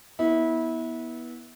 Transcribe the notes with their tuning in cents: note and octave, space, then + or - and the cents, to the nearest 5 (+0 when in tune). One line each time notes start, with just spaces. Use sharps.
B3 -20 E4 -25